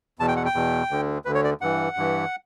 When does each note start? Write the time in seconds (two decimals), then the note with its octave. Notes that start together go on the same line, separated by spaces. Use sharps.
0.19 E2 B2 A5
0.28 G5
0.37 F#5
0.45 G5
0.54 E2 B2
0.90 D2 D3
1.25 D2 D3 B4
1.35 C#5
1.44 D5
1.61 G2 E3 F#5
1.97 G2 E3